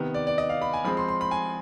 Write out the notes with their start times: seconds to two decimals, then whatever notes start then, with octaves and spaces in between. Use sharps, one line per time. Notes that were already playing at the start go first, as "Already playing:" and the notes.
Already playing: C3 D#3 B3
0.15 D5
0.27 D5
0.38 D#5
0.49 F5
0.62 B5
0.73 G#5
0.85 F3 G#3 C4 B5
0.97 C6
1.08 C6
1.21 B5
1.31 G#5